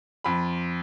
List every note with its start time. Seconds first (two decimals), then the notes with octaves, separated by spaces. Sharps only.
0.24 F2 B5